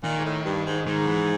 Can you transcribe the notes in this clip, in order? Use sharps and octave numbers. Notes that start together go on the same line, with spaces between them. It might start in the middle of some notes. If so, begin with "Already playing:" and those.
A#2 D#3
G#2
A2
G2
G#2
G#2 D#3
E3